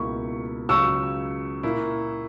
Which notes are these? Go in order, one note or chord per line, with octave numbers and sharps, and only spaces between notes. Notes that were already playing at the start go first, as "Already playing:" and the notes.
Already playing: C#2 B2 A#3 E4 C#6
C#2 C#3 F#3 C#6 E6
A#2 A#3 E4